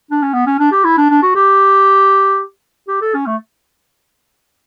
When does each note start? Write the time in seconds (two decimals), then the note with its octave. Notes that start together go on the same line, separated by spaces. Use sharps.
0.11 D4
0.22 C#4
0.33 B3
0.46 C#4
0.59 D4
0.72 G4
0.84 E4
0.98 D4
1.10 D4
1.23 F#4
1.35 G4
2.88 G4
3.02 A4
3.14 C#4
3.27 A3